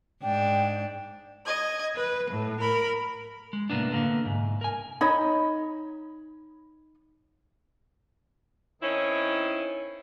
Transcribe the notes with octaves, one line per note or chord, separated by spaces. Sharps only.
G#2 D4 G5
D#5 G#6
B4
A2
A#4 B5
G#3
A2 C3 A#3 B3 D4
D3 A#3 B3
C2 G#2
A#4 G#5
D#4 C#5 D#5 B5
D#3 C4 C#4 D#4 E4